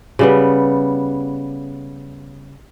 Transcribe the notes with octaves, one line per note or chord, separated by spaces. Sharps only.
C#3 G3 B3